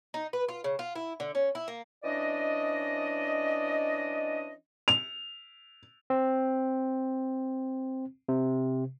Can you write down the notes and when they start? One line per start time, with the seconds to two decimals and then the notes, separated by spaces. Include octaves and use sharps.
0.14 D#4
0.33 B4
0.49 F4
0.64 C#3
0.79 F4
0.95 E4
1.20 D3
1.35 C#4
1.55 E4
1.68 A#3
2.04 E3 C#4 D4 D5 D#5
4.88 F7
6.10 C4
8.29 C3